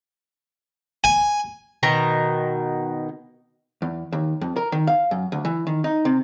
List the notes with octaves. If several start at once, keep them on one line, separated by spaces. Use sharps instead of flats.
G#5
B2 D#3 A#5
E2
D#2
F2
A#4
D#3
F5
F#2
D2
E3
D#3
D#4
C3